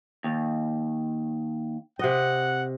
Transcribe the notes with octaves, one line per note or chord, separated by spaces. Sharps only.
D#2
C3 D#5 F#5